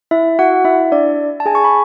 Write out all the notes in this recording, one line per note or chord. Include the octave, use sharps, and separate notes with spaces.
E4 E5
F#4 F#5
E4 E5
D4 D5
A5
G#4 G#5
C#6
B5